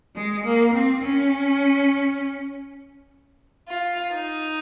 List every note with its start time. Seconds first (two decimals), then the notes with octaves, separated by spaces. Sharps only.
0.15 G#3
0.44 A#3
0.74 C4
1.03 C#4
3.68 F4
4.12 D#4